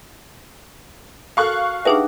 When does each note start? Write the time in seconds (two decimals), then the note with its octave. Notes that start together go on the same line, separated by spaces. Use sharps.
1.37 F#4 A4 A#4 F5 C#6 F#6
1.85 D4 D#4 G4 G#4 B4 E5 F#5 A5